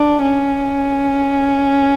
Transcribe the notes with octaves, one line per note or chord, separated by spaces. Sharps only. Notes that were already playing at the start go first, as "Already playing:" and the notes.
Already playing: D4
C#4